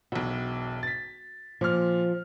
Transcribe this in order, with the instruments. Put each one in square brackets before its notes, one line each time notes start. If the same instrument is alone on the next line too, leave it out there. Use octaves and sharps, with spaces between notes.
[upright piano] E1 B1 [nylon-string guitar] F#4
[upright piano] A6 B6
[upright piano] A#2 F6 [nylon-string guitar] F3